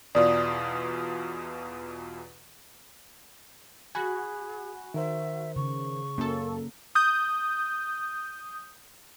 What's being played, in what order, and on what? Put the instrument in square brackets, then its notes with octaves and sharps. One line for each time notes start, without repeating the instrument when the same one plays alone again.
[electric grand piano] E2 B2 F4 [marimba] D5 [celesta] D#6
[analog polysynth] F#4 [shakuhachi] G#4 [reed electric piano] G#5 B5 F#6
[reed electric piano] D#3 A#4 C5 [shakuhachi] E5
[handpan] C#3 [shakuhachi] C#6
[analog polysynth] F#2 A4 [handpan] A#3
[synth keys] D#6 G6